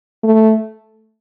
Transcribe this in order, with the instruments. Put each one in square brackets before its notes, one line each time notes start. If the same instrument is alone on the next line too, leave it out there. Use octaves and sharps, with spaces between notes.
[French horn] A3